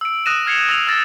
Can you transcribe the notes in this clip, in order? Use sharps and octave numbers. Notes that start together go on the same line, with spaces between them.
E6 D7
D#6 F#6 A#6 D#7 E7
F6 G#6 C7 C#7 F7
E6 A#6 F7
E6 F6 A6 A#6